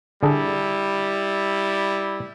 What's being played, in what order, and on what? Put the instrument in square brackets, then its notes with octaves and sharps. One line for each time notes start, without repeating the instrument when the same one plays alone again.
[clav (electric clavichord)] D3 G#4 A4 [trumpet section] G3 E4